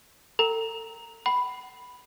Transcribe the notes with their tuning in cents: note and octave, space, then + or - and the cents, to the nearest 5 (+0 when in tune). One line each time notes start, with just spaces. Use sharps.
A4 +30 G5 -20 A#5 +0
F#5 +40 B5 +0